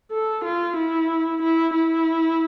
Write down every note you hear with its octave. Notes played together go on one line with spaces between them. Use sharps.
A4
F4
E4
E4
E4